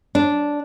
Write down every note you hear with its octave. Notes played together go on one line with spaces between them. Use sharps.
D4